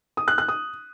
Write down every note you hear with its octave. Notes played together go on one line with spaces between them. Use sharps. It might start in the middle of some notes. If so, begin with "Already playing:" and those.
D#6
F#6
F#6
D#6